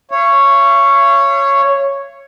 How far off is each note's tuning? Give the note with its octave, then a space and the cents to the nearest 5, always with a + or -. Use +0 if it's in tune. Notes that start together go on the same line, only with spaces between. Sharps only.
C#5 +0 F5 -45